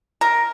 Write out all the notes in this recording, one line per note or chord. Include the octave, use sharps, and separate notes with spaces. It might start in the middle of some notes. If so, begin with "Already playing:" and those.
A#4